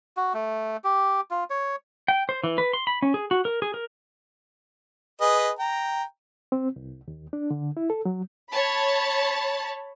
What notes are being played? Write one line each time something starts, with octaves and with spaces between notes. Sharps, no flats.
F#4
A3
G4
F4
C#5
G5
C5
E3
B4
C6
B5
C#4
G#4
F#4
A#4
G#4
A#4
G#4 B4 D#5
G5 A#5
C4
C2
D#2
D4
D3
E4
A4
F#3
C#5 A5 B5